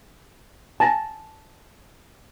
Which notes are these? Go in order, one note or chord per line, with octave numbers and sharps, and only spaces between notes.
G#5 A5 A6 A#6